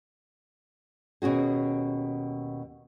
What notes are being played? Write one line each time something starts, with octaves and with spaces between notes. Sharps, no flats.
D#2 B2 C#4 F#4 G#4